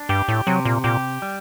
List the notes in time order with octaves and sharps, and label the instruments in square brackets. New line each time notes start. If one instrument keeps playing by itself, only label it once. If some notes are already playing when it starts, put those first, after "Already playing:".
Already playing: [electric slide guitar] D4
[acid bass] G2 [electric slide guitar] G4
[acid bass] A2
[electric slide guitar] C3 [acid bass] F#3
[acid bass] A#2
[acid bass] A#2 [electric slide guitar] G4
[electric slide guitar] G3